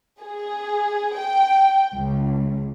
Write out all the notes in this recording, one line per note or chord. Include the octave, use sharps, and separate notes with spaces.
G#4
G5
C#2